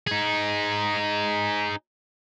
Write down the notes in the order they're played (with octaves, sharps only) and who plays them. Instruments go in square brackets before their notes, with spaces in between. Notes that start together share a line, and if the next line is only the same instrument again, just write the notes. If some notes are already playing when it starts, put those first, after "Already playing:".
[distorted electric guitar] D#4 G#4